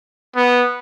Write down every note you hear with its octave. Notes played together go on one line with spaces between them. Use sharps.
B3